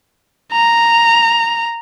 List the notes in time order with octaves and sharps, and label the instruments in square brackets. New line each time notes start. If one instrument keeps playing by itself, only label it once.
[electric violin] A#5